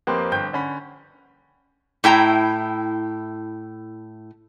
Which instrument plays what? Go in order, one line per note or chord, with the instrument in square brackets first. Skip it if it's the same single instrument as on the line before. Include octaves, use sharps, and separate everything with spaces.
[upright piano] F2 A#3 C4 G4 B4 C5
G1 G5 G6
D3 C#4 B5
[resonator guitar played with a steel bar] A2 E4 G5 A#5